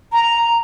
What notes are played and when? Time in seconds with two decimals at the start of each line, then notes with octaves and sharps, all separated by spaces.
0.12 A#5